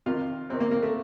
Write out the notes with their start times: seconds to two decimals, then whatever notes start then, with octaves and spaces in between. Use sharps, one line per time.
0.06 F2 C3 D#3 F4
0.50 F2 C3 D#3 C4
0.60 A#3
0.71 A#3
0.83 A3